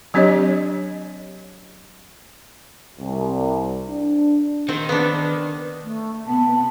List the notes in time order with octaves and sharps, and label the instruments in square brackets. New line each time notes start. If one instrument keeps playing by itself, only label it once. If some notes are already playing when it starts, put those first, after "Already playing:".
[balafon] F#3 C4 D4 G4 C#5 D#5
[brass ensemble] C2
D4
[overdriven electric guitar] D#3 [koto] C4
[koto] B3 D4
[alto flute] A3
[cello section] C3 B3 [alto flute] A5